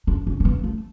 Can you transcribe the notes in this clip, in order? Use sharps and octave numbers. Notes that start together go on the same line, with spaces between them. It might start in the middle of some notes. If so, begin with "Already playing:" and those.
D4
C#4
C#4
B3
A3